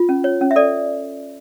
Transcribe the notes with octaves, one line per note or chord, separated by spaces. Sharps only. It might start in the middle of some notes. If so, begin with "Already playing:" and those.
Already playing: F4
C#4
C#5
C#4
E5
A4 D5